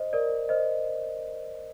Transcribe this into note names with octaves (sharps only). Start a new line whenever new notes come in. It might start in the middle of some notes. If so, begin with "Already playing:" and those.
Already playing: C5 D#5
A#4 D5
C5 D#5